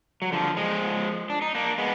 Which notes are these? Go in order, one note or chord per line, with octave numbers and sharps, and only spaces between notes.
F#3
D3 F3
F3 G#3
D4
D#4
A#3 D4
G#3 B3